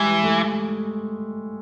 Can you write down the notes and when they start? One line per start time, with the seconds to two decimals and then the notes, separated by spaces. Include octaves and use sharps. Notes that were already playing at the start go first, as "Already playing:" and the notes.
Already playing: E3 G3 G#3
0.24 A3